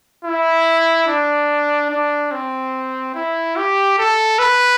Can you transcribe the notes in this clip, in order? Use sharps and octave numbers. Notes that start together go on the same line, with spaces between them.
E4
D4
D4
C4
E4
G4
A4
B4